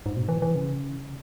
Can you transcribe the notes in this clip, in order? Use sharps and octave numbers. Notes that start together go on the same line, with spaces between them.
G#2
B2
E3
E3
C#3